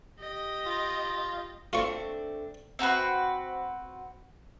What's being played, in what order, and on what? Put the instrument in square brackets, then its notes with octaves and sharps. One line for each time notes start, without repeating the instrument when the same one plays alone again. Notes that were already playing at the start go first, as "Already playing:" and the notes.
[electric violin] G4 D#5
[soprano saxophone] F4
[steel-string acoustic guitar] A3 C4 D4 [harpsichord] F4 C#6
[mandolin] C4 F#4 A#4 B4